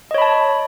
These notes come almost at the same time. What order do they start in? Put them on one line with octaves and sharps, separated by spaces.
D#5 C#5 B5 A5